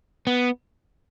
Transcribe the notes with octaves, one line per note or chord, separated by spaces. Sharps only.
B3